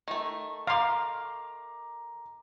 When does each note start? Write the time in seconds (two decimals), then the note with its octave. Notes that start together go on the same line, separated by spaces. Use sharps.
0.08 D#3 A3
0.67 F5 A#5 C6 D6